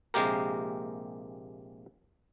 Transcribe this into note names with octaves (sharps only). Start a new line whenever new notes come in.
A#1 C3 G#3 A#3 G4 A#4